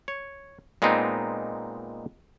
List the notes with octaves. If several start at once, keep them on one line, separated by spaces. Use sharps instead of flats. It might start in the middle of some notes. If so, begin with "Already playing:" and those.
C#5
A#2 G#3 B3 C4 D#4